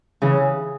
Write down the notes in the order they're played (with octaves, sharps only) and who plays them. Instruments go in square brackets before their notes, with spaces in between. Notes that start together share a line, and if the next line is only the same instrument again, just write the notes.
[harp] C#3 E3